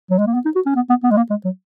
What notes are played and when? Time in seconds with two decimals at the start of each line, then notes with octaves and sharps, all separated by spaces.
0.10 F#3
0.18 G#3
0.27 A#3
0.34 B3
0.45 D#4
0.55 F#4
0.66 C#4
0.76 B3
0.90 B3
1.03 B3
1.11 G#3
1.17 A#3
1.30 G#3
1.45 F#3